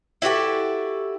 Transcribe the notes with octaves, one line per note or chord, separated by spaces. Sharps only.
E4 F#4 G4 A4